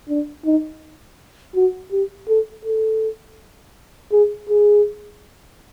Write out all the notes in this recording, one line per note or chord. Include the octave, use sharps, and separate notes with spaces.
D4
D#4
F#4
G4
A4
A4
G#4
G#4